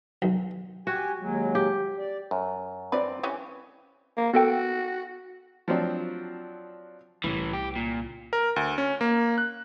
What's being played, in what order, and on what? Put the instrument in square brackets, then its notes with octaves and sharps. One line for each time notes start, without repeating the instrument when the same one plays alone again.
[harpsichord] B1
[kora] F#4 [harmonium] G4 G#5
[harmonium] D#2 F#3 G#3
[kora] G4
[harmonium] D5
[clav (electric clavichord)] F#2
[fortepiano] C4 D5 [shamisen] B4
[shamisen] E3 C#4 G4
[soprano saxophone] A#3
[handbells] B3 A4 G5 [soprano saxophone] F#4
[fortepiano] F3 F#3 C4 D4
[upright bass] C2 C#3 [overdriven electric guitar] A2 E3
[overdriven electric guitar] G4
A#2
[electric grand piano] A#4
D2
C#4
A#3
F#6